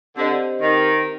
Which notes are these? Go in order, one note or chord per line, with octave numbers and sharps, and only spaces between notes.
D3 C4 G4 C5 D#5
D#3